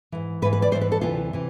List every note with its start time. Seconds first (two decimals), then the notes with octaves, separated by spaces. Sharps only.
0.12 G#2 E3
0.42 G#2 B4
0.45 E3
0.53 B4
0.62 D5
0.72 G#2 C5
0.75 E3
0.81 B4
0.92 A4
1.01 D2 C3 E3 F4
1.33 C3 E3